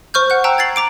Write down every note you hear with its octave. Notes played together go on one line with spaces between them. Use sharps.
C5 C#6 F6 G6
F#5 F#6
G5 A5 A#5 E6 F#6
G#6 A6 C7 F#7
A#5 D6 D7